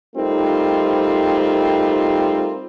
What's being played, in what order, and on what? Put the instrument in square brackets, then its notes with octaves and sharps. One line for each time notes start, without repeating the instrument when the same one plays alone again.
[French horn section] G3 A3 C4 D#4 F4 A#4